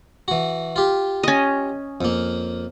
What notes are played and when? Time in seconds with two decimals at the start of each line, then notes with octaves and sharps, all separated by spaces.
0.28 E3 F#4
0.76 F4 G4
1.23 C#4 D#5
2.01 F2 A#3